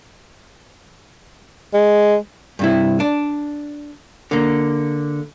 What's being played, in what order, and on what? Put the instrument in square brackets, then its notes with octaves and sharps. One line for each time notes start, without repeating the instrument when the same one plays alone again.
[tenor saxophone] G#3
[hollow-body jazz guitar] G2 C3 E4
D4
D3 A#3